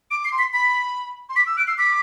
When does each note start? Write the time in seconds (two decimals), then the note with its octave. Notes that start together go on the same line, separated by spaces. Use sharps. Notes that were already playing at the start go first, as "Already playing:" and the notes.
0.11 D6 D7
0.25 C7
0.32 C6
0.39 B6
0.53 B5 B6
1.29 C6
1.36 D6 B6
1.46 E6
1.57 F#6 D7
1.67 E6 C7
1.77 D6 B6